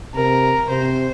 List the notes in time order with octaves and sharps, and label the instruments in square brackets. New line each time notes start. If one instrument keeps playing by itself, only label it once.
[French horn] C3 [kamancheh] A#4
[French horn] C3 [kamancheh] C5